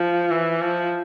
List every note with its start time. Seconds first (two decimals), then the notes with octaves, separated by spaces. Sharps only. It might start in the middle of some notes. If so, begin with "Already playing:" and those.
Already playing: F3
0.31 E3
0.60 F3